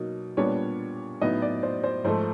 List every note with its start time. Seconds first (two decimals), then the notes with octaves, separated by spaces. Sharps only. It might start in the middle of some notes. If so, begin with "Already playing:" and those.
Already playing: B2 F#3 A#3 D#4
0.37 A#2 G3 B3 D4 C#5
1.22 A2 F#3 B3 D#4 D#5
1.42 D5
1.63 C5
1.84 C5
2.04 G#2 F3 A3 C5